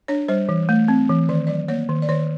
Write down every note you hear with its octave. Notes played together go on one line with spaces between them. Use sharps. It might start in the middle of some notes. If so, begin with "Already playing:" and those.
D4 C#5
G3 C5
E3
A3
C4
E3
D#3 D5
F#3 D5
A#3 C#5
D#3
D5
D#3 C#5